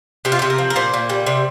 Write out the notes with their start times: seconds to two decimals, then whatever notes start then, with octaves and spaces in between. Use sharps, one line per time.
0.25 C3 G4
0.32 F4
0.39 G4
0.42 C3
0.50 A#4
0.58 F3
0.70 A#4
0.76 A#2 C5
0.94 A#2
1.10 G3
1.27 C3